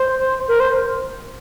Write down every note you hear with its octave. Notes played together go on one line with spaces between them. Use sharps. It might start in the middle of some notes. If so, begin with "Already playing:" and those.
Already playing: C5
A#4
C5